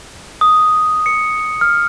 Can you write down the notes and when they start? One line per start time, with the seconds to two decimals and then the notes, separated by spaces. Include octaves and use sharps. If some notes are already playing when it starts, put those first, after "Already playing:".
0.41 D#6
1.06 C#7
1.61 F6